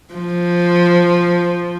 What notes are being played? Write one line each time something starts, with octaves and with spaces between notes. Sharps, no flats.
F3